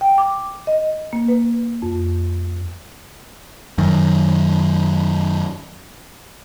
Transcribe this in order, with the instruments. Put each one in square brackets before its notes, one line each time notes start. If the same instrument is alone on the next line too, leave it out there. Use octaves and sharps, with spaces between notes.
[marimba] G5
D6
D#5
A#3
B4
F2
[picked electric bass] F#2 D#3